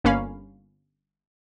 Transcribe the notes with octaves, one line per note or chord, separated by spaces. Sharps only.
G1 A#3 C#4 F5 B5